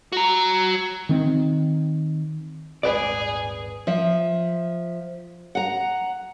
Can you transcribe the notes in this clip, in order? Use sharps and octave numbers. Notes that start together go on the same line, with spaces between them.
F#4 A#5
D#3 C4
D#1 G#1 G#4 B4 D5
F3 E5
F#5 A#5